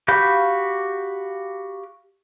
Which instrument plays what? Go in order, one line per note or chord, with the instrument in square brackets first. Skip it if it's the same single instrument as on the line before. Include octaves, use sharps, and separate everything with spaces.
[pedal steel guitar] F#4 G4 F5 B5 G6